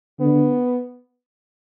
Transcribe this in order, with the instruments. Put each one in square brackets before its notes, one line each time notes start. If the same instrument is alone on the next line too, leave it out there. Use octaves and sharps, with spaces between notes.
[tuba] D3 [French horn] B3